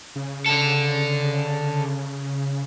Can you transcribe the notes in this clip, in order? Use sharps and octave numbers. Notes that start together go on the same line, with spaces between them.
C#3
D3 A4